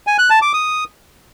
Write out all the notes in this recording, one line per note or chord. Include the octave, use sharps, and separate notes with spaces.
G#5
F#6
A5
D6
D#6